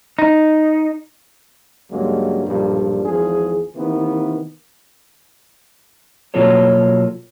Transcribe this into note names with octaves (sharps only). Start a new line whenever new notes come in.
D#4
C#2 G2 F#3 G#3 A#3
B1 G2 A#2 F3 G3
G#1 E2 F3 G#4
C3 D#3 E3 A#3 B3
B2 F#3 A#3 F4 A4 C#5